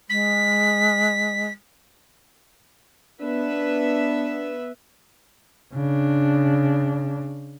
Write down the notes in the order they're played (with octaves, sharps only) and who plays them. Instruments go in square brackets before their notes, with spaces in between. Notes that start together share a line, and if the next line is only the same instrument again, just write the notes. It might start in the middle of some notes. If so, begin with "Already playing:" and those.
[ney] G#3 [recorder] B6
[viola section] B3 B4 E5 [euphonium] D4
[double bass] C#3 D4